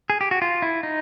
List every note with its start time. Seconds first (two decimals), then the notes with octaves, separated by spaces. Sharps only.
0.10 G#4
0.21 G4
0.31 F#4
0.42 F4
0.62 E4
0.83 D#4